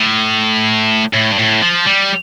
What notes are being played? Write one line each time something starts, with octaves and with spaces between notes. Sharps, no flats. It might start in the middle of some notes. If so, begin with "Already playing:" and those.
Already playing: A2
A2
G2
A2
F3
G3